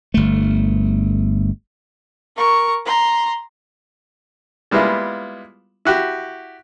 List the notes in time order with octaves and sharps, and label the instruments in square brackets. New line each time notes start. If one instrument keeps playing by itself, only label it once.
[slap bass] G1 A3
[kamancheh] A#4 C#6
A#5 C6
[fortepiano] G3 G#3 A#3 B3 E4 F4
E4 F#4 G4